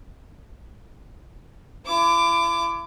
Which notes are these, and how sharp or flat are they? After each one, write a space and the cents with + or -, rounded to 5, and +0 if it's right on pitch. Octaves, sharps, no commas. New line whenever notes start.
E4 +40 D6 +5